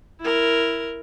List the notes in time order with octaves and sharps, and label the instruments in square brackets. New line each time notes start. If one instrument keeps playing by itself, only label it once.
[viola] E4 A#4